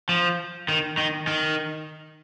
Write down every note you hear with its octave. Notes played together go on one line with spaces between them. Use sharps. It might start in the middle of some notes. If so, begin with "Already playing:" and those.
F3
D#3
D#3
D#3